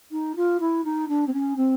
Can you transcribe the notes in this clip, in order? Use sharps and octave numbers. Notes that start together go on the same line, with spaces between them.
D#4
F4
E4
D#4
D4
C4
C#4
C4